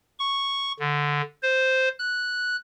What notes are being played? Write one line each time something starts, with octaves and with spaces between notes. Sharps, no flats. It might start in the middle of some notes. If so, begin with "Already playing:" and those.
C#6
D3
C5
F#6